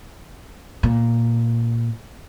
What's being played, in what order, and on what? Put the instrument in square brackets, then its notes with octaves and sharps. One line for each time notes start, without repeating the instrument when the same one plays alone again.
[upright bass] A#2